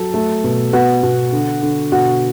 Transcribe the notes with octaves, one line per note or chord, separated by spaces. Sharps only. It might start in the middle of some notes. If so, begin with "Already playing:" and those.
Already playing: F#3 A4
A3
B2
B3 F#4
B2
D3
D3
B2 F#4